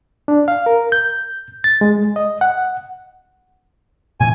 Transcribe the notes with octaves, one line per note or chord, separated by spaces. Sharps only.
D4
F5
A#4
G6
A6
G#3
D#5
F#5
A#2 C#3 E3 G#5